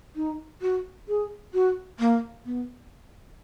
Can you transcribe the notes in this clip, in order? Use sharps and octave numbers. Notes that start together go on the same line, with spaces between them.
D#4
F#4
G#4
F#4
A#3
B3